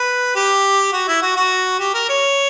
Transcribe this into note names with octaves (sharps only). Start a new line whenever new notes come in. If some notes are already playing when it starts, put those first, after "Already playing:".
Already playing: B4
G4
F#4
E4
F#4
F#4
G4
A#4
C#5